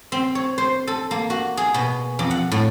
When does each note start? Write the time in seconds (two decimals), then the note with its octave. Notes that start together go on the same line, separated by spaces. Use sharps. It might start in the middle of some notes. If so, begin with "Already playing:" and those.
0.12 C4
0.35 C#5
0.58 C5
0.87 A4
1.11 A#3
1.30 F#4
1.57 G#4
1.74 B2
2.19 F2
2.31 F#5
2.52 A2